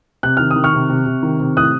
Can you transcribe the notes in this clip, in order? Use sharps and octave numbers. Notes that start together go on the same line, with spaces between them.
C3 F#6
D#3 F6
D#6
D#3
C#6 F6
C3
C3
C3
D#3
C3
A2 D#6 F#6